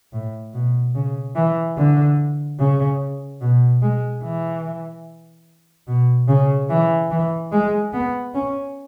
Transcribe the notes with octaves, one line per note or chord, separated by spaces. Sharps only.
A2
B2
C#3
E3
D3
C#3
B2
G#3
E3
B2
C#3
E3
E3
G#3
B3
C#4